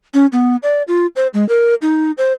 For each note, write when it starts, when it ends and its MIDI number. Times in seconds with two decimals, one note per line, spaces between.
0.14 0.26 61
0.33 0.56 59
0.63 0.82 74
0.88 1.07 65
1.16 1.27 72
1.34 1.47 56
1.49 1.75 70
1.82 2.11 63
2.18 2.33 72